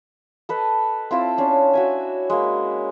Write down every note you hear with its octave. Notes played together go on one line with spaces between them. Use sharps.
A4 B4 D#5
C4 E4 F4 A5
C#4 D4
F#4 E5 G#5
G#3 A#3